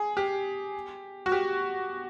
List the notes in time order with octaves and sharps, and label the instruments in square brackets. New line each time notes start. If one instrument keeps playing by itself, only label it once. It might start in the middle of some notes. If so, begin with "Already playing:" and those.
Already playing: [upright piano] G#4
G4
F#4
G4